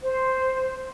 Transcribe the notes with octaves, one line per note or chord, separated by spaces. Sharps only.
C5